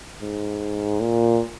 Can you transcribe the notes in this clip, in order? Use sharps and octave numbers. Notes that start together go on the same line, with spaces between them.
G#2
A#2